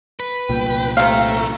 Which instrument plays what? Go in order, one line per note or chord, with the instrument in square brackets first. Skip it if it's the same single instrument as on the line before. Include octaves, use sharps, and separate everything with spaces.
[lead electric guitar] B4
[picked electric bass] C2 A#2 [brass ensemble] G5
[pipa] C3 F5 [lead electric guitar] A3 [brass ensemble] A#5